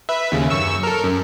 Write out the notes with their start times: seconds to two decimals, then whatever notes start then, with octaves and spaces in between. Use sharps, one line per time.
0.09 B4 E5
0.32 D#2 C#3
0.50 F#2 C#6 E6
0.83 A4 A#4
1.04 F#2